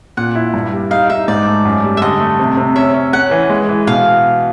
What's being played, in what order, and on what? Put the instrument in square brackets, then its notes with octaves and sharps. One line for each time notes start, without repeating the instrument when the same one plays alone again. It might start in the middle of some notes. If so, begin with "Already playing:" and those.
[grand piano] A#2 [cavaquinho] F#5
[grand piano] E4
G2
G3
[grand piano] D#4 [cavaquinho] F5
[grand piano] D#4 [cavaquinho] E5
[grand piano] G#2 [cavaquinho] D5
[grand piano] A3
F#2
G3
[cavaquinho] E5
[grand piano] D3 [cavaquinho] D#5
[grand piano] A3
C3
C3
[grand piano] C#4 [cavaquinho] E5
[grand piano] C#4
[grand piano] C#4 [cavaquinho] F#5
[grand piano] E3
G#3
E3
[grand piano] B2 [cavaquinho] F5